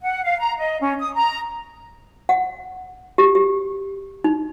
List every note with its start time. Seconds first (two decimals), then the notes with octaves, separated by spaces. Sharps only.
0.02 F#5
0.24 F5
0.39 A#5
0.59 D#5
0.80 C#4
0.99 D#6
1.14 A#5
2.29 F#5
3.18 G4
3.35 G4
4.24 D#4